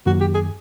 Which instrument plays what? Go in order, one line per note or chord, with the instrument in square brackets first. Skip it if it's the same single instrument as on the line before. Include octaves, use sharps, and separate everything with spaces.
[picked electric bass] F#2 D#3 F#3 A#3 [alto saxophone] F#4
[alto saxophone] G4
G#4